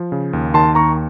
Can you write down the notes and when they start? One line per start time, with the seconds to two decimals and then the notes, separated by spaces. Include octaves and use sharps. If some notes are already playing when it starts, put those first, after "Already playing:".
Already playing: F3
0.12 C#3
0.33 D#2
0.54 D#3 A5 C6
0.75 D#2 A#5 C#6